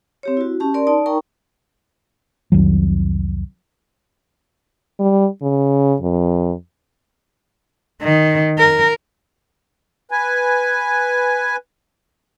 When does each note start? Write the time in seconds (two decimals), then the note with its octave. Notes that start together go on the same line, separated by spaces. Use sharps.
0.23 C4 G4 C#5
0.37 E4 F#4
0.60 C#4 G4 A5
0.74 A#4 D5 C6
0.87 D#4 D5 A5
1.06 D#4 A#4 G5 A#5 C#6
2.52 C2 F2 D#3 F#3
5.00 G3
5.42 C#3
6.01 F2
8.02 D#3
8.59 A#4
10.11 B4 G#5